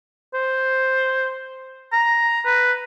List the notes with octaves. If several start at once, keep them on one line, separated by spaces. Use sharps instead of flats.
C5
A#5
B4